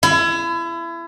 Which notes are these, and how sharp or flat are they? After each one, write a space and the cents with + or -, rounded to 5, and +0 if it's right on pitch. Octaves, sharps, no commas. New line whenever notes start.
E4 +30